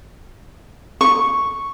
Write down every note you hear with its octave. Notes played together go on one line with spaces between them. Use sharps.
C#6